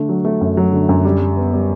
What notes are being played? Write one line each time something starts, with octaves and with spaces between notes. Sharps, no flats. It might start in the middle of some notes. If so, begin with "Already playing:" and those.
Already playing: D3 A3
F#3
A3
F#2
F#3
D3
F#2
G3
G3
B3
G3